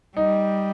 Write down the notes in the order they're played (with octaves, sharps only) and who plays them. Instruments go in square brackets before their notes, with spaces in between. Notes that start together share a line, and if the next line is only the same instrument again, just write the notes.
[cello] G3 [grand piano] D#4